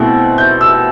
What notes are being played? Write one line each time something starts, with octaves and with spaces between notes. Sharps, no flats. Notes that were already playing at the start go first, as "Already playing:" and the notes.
Already playing: B2 A3 C4 E4
G6
E6